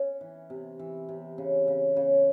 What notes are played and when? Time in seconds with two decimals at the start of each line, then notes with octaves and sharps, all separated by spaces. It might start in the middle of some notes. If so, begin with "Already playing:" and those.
Already playing: C#4
0.21 E3
0.50 C3
0.79 E3
1.09 C3
1.38 C#3
1.68 C#3
1.97 C#3